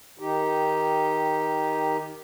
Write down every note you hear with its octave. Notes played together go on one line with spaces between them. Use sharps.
D#3 D#4 G4